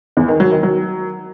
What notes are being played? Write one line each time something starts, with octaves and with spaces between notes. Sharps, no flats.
E2
D#3
F#3
D#3
F#3